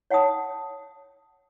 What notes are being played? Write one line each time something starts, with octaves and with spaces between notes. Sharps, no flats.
C#5 F#5 G5 A5 D#6